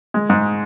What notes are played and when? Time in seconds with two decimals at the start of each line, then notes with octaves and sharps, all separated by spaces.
0.14 G#3
0.30 G#2